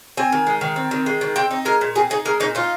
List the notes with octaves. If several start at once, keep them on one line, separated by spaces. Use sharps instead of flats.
C4 G#5
D#3
G#3
D#3
C4
D#3
G#3
D#3
C4 G5
D#4
G#3 A#4
A#2
C4 G#4
D#4 G#4
G#3 A#4
A#2 D#4
D#4 F4